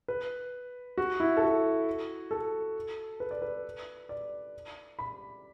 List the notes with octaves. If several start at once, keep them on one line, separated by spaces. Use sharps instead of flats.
B4
F#4
E4
A4
F#4
A4
B4
D5
B4
D5
B5